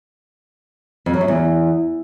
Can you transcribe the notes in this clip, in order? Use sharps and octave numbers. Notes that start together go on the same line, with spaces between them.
F2
F#3
F#2
E2